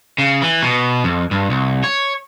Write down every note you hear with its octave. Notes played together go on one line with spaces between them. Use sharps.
C#3
E3
B2
F2
G2
C2
C#5